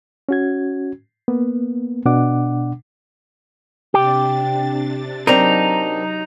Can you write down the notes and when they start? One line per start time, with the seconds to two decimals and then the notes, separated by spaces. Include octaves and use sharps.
0.29 C#4 F#4 G#6
1.28 A#3 B3
2.06 B2 D4 F#5 D6
3.94 C3 D4 G4 A6
5.27 F#3 C4 D4 D#4 A#4 A#5